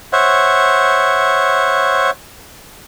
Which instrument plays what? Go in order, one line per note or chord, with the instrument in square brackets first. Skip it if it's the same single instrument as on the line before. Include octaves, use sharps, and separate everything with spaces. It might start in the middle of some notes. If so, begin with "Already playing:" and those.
[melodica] C5 C#5 E5 F#5